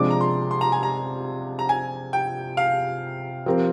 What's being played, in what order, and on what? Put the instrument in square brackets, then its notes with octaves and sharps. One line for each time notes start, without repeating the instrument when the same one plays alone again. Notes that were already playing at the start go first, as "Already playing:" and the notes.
Already playing: [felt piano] C3 F3 G#3 D4 [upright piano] D6
[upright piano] A#5
C6
C6
A#5
G#5
A#5
A#5
G#5
G5
F5
[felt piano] F3 C4 G4 A#4